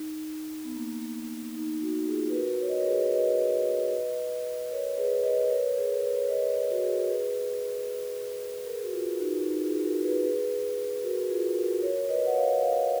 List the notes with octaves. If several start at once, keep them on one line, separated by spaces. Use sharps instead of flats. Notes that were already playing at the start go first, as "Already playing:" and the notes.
Already playing: D#4
B3
A#3
D#4
D#4 F#4
F4 G#4
B4
F#4 A#4
C#5
D#5
A#4 C#5
G#4 B4
B4 D#5
A#4 C#5
G#4 B4
B4 D#5
B4
A#4 C#5
G#4
A#4
B4
C#5
B4 D#5
F#4
G#4
A#4
G#4 B4
A#4
G#4
F#4 A#4
F4 G#4
D#4 F#4
D#4 F#4
F4 G#4
F#4 A#4
G#4 B4
G#4 B4
F#4 A#4
F4 G#4
F#4 A#4
A#4 C#5
B4 D#5
F#5
C#5 F5
C#5 F5